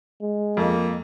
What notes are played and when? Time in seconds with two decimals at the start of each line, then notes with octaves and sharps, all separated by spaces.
0.21 G#3
0.57 F2 A#3